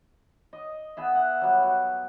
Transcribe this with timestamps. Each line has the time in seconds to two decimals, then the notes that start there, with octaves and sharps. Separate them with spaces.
0.53 D#5
0.97 B3 G#4 E5
1.15 F#5
1.41 F#3 G3
1.63 F#4